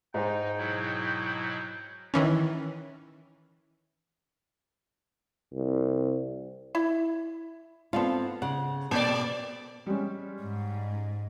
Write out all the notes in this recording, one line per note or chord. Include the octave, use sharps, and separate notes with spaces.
G#2 D#4 C5 G5
B2 F#3 E4
D#3 E3 C#4
C2
E4
D3 B3 C4 F4 A4
C#3 F#5
B2 A#3 C4 A4 D5
G3 G#3 C#4
G#2